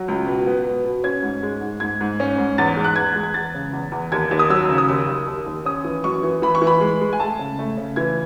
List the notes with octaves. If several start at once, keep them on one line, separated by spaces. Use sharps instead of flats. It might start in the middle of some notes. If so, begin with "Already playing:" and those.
Already playing: F#3
C#2
B2
B3
B2
B2
C#4 G#6
G#2
G#3
G#2
G#2 G#6
G#2
C#4
G#2
E2 A6
G#3
F#6
E2 G#6
G#3
G#6
E2 A6
C#3
E2
E2
D#2 G#6
D#2
D#6
F#3 E6
C#3
D#6
D#2 E6
D#2
D#2
D#2
C#4 D#6
E3
F#2 C#6
E3
E3 B5
C#6
E3
B5
G#3
G#3
G#5
A3 A5
C#3
A3
C#3
E3 G#6